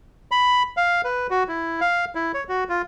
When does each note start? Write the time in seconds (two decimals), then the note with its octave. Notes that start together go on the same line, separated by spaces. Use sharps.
0.31 B5
0.77 F5
1.04 B4
1.30 F#4
1.48 E4
1.81 F5
2.15 E4
2.34 C#5
2.49 F#4
2.69 F4